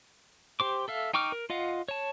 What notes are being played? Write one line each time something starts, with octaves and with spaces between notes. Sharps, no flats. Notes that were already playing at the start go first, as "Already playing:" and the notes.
G4 C5 D6
A4 E5 F5
D#4 G5 C#6 D6 F6
A#4
F4 D#5 F5 F#5
C#5 A5